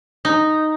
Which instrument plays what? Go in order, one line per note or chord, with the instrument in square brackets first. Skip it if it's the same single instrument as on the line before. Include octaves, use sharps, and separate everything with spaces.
[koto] D#4